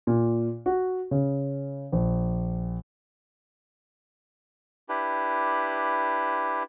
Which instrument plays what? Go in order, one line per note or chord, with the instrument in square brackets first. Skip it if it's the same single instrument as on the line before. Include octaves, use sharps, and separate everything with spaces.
[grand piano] A#2
F#4
C#3
A#1
[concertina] D4 E4 G4 B4